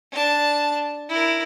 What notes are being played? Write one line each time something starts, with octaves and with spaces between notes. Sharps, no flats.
D4 A5
E4 A#4